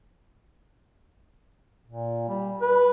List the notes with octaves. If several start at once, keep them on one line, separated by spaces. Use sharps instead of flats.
A#2
G3
B4